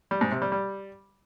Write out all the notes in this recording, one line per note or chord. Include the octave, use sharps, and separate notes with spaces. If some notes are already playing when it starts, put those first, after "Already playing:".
G3
G#2
C3
G3
G3